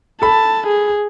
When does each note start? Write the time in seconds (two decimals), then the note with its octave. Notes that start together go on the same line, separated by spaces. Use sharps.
0.22 A4 A5 B5
0.67 G#4